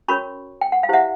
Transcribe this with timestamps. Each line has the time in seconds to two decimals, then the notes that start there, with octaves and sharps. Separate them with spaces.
0.08 C#4 F#4 A#4 C#5 B5 C#6
0.61 G5
0.72 F#5
0.83 F5
0.89 E4 G4 C5 E5 F#5